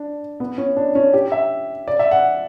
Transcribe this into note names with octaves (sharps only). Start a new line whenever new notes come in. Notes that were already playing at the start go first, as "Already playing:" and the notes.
Already playing: D4
B3
C#4
D4
C#4
G4
E5
D5
E5
F#5